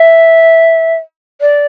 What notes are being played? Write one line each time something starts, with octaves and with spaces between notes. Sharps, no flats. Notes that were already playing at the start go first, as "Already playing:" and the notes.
Already playing: E5
D5